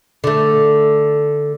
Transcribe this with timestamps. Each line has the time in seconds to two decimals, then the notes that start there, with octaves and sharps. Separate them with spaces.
0.24 D3 A3